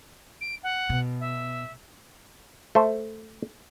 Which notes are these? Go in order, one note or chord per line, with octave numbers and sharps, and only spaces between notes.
D7
F#5
B2
E5
A3 C5